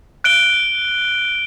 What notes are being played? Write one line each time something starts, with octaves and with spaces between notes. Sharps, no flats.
F#6 D7 G7